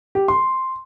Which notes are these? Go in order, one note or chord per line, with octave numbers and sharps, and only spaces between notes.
G4
C6